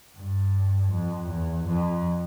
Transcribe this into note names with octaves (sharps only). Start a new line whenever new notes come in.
G2
F2
E2
F2